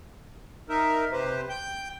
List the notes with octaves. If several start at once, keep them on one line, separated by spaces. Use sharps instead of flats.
D#4 A#4 E5
C3 G4 B4 C5
G5 G6